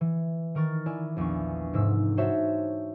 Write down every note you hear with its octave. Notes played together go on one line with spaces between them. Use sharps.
E3
D#3 A#4 C#6 A6
E4 D5 G#5
A#1 E2 B3 D4 C#6
F1 G#2 E6
D#4 F#4 C5 C#5 E5 A5